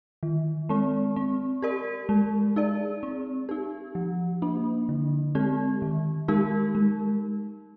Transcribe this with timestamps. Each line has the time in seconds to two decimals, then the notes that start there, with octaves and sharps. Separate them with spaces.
0.23 D#3
0.69 G#3 C4
1.16 C4
1.62 G4 A#4 D5
2.09 G#3
2.56 D#4 G#4 D5
3.03 C4
3.49 D#4 G4
3.95 F3
4.42 A#3 D4
4.89 D3
5.35 G#3 C4 G4
5.82 D#3
6.28 G#3 D#4 G4 A#4
6.75 G#3